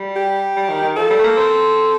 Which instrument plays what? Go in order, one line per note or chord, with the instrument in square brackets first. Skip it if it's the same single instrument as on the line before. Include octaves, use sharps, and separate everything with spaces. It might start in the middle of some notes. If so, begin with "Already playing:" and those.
Already playing: [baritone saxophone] G3
[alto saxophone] G4
[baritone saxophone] G3
D#3
D#3
[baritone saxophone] F3 [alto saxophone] A4
[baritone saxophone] G3
A3
A#3
C4